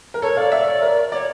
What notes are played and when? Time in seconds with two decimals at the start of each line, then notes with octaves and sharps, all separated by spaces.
0.14 A#4
0.22 A4 C#5
0.37 D5 F5
0.52 E5
0.68 C#5
0.82 A#4
1.12 C#5 D5